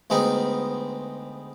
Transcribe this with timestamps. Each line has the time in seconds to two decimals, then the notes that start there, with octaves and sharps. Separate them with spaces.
0.10 D2 G#3 B3 C4 D#4